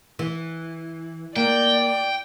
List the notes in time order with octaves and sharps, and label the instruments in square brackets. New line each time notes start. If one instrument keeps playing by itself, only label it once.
[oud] E3
[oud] A#3 [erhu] D5 [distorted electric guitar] G5